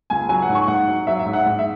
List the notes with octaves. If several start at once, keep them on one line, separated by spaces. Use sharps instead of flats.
C#2 G#5
F#3 G#5
F#5
G#2
C#6
G#2 F#5
F#3
F#3 E5
E5
G#2
F#5
G#2
E5